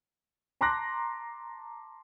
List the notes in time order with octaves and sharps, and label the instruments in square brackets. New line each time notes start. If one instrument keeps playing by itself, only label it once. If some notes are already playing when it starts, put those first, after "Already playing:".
[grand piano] A5 A#5 C6 D6 F#6 A#6